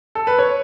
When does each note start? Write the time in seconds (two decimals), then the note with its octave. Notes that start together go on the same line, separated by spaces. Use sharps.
0.15 A4
0.27 B4
0.39 C#5